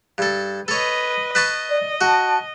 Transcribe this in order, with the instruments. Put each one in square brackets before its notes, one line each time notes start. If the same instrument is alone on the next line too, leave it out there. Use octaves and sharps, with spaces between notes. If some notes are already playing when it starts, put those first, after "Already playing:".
[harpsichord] G2 A4
[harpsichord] A4 C#5 [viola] B4 D#5
[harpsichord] B4 A5 C#6 [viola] D#5
[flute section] D5
[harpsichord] F#4 [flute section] A5